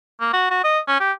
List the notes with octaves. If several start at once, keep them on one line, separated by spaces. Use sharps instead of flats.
A#3
F#4
F#4
D#5
C#4
G4